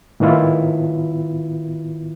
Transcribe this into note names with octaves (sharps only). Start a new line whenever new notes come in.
A2 D#3 B3 E4 F4